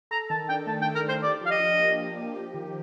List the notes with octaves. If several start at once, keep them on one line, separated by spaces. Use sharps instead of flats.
A4 A#5
D#3 A5
D4 G5
A3 A5
G5
A4
A#4
D#3 C5
G4 D5
F3 F5
D#5
D4
A#3
G4
F3
G4
D#3